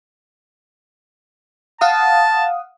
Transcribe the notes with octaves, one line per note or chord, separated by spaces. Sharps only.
F5 F#5 A5 D#6